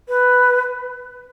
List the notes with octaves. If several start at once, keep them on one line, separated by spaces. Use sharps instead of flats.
B4